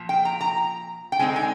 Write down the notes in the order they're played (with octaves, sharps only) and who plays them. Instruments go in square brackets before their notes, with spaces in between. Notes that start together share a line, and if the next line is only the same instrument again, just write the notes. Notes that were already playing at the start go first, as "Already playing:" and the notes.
Already playing: [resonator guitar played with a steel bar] A#2 F3
G5
A#5
A#5
G5
D3 G#3 C4 D#4 G#5
G#5